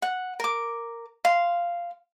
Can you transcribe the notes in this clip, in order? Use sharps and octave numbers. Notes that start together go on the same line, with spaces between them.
F#5
A#4 D6
F5 C6